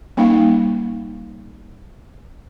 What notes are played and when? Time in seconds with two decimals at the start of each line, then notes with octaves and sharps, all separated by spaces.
0.17 G3 A#3 C#4 D#4 F5